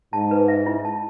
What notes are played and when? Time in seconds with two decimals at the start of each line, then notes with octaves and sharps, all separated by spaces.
0.13 G#2 A5
0.31 B4
0.48 E5
0.66 E4
0.85 A5